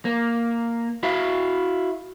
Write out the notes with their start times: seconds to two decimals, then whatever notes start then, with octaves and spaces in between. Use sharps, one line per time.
0.05 A#3
1.03 E4 F#4 E5 F5